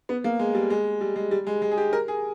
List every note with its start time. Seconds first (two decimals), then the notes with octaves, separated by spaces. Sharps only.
0.09 B3
0.24 A#3
0.39 G#3
0.55 G3
0.70 G#3
1.01 G3
1.16 G#3
1.31 G3
1.47 G#3
1.62 G#3
1.71 G#4
1.77 G4
1.93 A#4
2.08 G#4